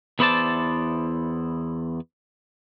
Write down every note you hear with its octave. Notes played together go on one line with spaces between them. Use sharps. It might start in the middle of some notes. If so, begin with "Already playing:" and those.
E2 B3 E4 C5 D5 A5